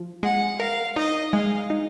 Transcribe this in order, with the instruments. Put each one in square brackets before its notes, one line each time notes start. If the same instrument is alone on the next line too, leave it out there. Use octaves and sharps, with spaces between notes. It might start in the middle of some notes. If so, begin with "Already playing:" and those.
Already playing: [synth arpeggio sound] F3
[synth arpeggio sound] G#3 [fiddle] F#5
[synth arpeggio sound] A#4 [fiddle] F5
[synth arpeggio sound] D#4 [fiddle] D#5
[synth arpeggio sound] G#3 [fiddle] F5
[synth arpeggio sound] D#4